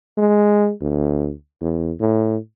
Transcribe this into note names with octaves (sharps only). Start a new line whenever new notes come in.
G#3
D2
E2
A2